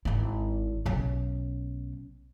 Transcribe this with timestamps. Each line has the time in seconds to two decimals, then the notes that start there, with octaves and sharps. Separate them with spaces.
0.05 G#1 E4
0.86 B1 C#4